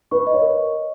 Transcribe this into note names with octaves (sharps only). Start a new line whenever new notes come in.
B4 C#6
D#5
C#5
A#4